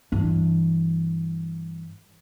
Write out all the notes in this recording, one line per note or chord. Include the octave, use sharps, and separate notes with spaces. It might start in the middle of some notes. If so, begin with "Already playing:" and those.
G2 E3